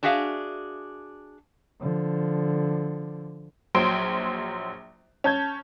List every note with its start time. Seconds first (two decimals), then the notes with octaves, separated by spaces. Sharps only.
0.03 D4 F#4 G#4 E5 F5
1.80 D3 F3
3.75 A#1 F#3 C5 C6 D7
5.24 C#4 A5 G6 G#6